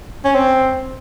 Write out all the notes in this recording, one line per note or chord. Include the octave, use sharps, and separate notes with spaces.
C#4
C4